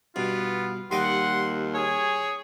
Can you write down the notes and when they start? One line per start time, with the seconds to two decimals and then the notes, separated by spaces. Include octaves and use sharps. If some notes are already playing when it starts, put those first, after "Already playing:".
0.16 G2 B2 B3 F4
0.91 D#2 G3 D#5 F#5 C6 D6
1.74 G#4 C#5